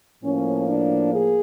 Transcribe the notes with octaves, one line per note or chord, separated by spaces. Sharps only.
A2 F3 A#3 C#4
D4
G#4